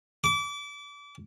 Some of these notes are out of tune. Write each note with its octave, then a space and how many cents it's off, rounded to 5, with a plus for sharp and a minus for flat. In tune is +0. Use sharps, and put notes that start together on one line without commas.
D6 -30